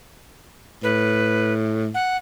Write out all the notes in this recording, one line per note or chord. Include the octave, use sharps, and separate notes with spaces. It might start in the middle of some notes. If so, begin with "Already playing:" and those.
A2 B4
F#5